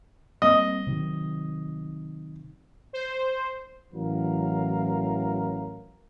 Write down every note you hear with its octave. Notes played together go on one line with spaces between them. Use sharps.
G3 A#3 C4 D#5
C3 D#3 F#3
C5
A1 E3 F#3 A#4 F5